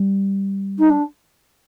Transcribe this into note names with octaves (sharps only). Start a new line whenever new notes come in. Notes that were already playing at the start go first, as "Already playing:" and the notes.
Already playing: G3
D#4
D4